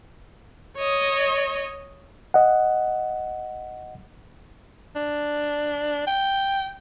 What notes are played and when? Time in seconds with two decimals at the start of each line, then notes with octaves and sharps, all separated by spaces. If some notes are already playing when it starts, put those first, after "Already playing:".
0.77 C#5 D#5
2.34 D#5 F#5
4.96 D4
6.07 G5